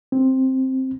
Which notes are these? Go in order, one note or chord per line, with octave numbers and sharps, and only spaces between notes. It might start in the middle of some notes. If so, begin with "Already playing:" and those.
C4